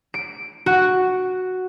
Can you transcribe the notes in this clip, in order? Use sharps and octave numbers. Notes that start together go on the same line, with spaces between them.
D7
F#4